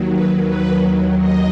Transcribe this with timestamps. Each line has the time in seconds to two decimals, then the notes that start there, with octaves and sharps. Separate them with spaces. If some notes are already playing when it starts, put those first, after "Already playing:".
Already playing: D#2 D#3 F#3
0.12 B4
0.47 B4
1.18 D#5